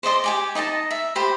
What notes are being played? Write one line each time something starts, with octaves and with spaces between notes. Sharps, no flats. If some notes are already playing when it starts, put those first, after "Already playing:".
C5 D5 D#5 C6
G4 G#5 D6
D#4 D#5 E5 A5
E5
G4 C5 B5